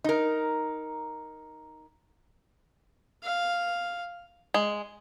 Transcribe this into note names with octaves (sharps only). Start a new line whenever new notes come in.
D#4 A#4
F5
G#3